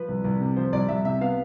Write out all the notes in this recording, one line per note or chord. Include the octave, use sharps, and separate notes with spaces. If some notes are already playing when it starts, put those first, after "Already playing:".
Already playing: F3 B4
C2
C2
C3
F3 C5
C2 D5
C2 E5
C3 E5
B3 F5